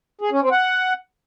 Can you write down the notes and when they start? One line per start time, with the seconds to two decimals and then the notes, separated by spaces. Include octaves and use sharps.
0.21 G#4
0.31 C#4
0.42 C4
0.52 F#5